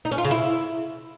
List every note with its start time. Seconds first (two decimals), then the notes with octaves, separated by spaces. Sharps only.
0.05 D#4
0.11 C#4
0.18 F4
0.24 C#3
0.31 E4